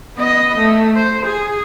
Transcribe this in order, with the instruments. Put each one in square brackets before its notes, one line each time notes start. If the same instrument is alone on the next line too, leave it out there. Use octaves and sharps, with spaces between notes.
[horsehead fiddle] B3 D#5
A3
C5
G#4